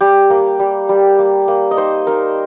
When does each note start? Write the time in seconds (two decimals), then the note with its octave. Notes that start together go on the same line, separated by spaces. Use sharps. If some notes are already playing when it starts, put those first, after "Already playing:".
0.01 G3 G4
0.30 A#3
0.59 G3
0.89 G3
1.19 A#3
1.48 A#3
1.71 D#5
1.77 D#4 C5
2.07 D#4 A#4